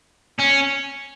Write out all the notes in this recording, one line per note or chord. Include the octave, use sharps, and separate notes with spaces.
C#4